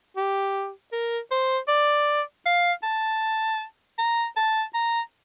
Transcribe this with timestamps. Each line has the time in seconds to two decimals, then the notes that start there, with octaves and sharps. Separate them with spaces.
0.17 G4
0.93 A#4
1.31 C5
1.69 D5
2.46 F5
2.83 A5
3.99 A#5
4.37 A5
4.74 A#5